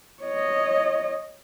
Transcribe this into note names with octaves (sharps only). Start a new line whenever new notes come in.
C#5 D#5